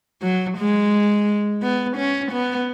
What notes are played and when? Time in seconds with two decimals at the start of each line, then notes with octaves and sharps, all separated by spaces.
0.23 F#3
0.58 G#3
1.62 B3
1.97 C#4
2.32 B3